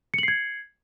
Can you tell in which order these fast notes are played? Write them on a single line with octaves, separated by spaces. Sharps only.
C#7 F#7 C7 G#6